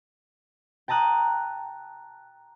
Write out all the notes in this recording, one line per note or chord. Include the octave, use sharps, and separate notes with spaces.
G5 A5 A#5 D#6 F#6